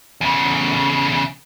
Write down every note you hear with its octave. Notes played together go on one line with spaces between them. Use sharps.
E2 C#3